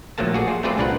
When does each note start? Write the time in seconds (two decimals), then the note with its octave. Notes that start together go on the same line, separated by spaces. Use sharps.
0.18 A#1 F3 F#3 A3 A#3 A5
0.34 F#4 G#4 D5
0.48 F4
0.63 A3 C4 F4 G#4 B4 D5
0.78 C2 A#2 D4 A#4 B4 F#5